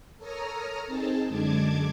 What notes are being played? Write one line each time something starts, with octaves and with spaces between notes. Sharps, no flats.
A4 A#4 C#5 A#5 D#6 F6
C4 D#4 G#4 A5
F#2 D3 G#3 A5 D6 G#6